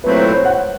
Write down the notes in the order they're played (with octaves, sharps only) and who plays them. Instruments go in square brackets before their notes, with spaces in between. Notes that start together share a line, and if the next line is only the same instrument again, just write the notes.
[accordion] A#2 F#3 A3 C4 E4 [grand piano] B4
[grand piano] C5
C#5
F#5